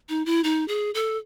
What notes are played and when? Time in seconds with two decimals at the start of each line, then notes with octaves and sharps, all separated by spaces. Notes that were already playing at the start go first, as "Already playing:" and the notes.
0.09 D#4
0.26 E4
0.44 D#4
0.68 G#4
0.94 A4